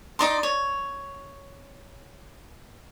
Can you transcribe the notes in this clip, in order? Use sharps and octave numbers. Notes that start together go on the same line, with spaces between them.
D#4 D5 C6
C#5